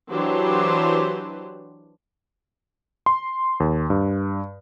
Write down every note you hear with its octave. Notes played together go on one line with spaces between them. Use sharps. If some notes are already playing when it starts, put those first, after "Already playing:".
E3 F#3 D4 G4 B4 C5
C6
D#2
G2